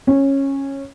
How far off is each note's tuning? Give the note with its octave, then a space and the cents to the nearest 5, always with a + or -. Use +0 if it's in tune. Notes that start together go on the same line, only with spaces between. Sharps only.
C#4 -15